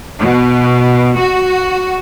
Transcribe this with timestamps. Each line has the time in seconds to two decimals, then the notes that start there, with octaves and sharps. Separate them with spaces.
0.20 B2
1.17 F#4